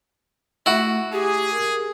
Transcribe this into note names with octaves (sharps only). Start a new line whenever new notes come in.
A3 E4 F#4
G4 G#4
A#4